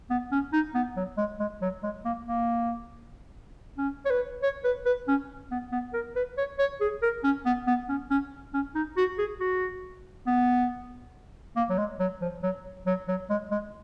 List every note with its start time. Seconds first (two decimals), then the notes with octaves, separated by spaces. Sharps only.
0.10 B3
0.32 C#4
0.53 D#4
0.75 B3
0.96 F#3
1.18 G#3
1.40 G#3
1.62 F#3
1.83 G#3
2.05 A#3
2.26 A#3
3.78 C#4
4.05 C#5
4.10 B4
4.43 C#5
4.64 B4
4.86 B4
5.08 C#4
5.51 B3
5.72 B3
5.94 A#4
6.16 B4
6.37 C#5
6.59 C#5
6.81 G#4
7.02 A#4
7.24 C#4
7.46 B3
7.67 B3
7.89 C#4
8.10 C#4
8.53 C#4
8.75 D#4
8.97 F#4
9.18 G#4
9.40 F#4
10.27 B3
11.56 A#3
11.70 F#3
11.78 G#3
12.00 F#3
12.21 F3
12.43 F#3
12.87 F#3
13.08 F#3
13.30 G#3
13.51 G#3